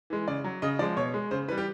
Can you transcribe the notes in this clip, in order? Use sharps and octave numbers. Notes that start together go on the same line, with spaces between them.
E3 G#3
C#3 D5
F#3
C#3 D#5
F3 G#3 D5
B2 C#5
G#3
C#3 C5
E3 G3 B4
G4